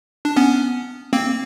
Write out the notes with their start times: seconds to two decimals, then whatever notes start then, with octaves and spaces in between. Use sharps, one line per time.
0.25 D4
0.36 B3 C#4
1.13 A#3 C4